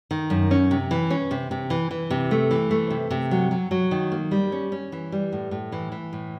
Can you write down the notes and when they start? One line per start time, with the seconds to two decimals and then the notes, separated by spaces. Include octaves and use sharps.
0.11 D#3
0.30 F#2
0.51 C#4
0.71 C3
0.91 E3
1.10 C#4
1.31 C3
1.51 C3
1.70 E3
1.91 E3
2.10 C3
2.31 A3
2.51 E3
2.71 A3
2.90 C3
3.11 C3
3.31 F#3
3.51 F#3
3.71 F#3
3.91 D#3
4.12 A#3
4.31 G3
4.52 C#4
4.72 C#4
4.92 E3
5.12 G3
5.32 A2
5.51 A2
5.72 E3
5.92 E3
6.13 A2